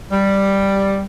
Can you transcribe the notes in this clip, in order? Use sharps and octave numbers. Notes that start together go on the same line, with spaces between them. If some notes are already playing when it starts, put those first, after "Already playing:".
G3